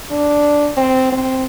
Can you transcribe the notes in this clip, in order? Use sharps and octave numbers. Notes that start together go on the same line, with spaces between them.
D4
C4
C4